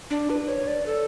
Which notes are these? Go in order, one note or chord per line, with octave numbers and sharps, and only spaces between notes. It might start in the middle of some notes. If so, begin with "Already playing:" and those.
D4
B4
C#5
D5
A4